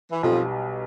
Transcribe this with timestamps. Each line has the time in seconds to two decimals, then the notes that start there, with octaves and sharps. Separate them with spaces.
0.12 E3
0.23 B1 F2 B2 F3 G3 B3